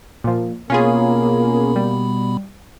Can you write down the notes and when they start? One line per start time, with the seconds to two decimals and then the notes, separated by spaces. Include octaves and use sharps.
0.24 A#2 F3
0.70 B2 A#3 B3 C#4 F4 G#4 B5
1.76 G3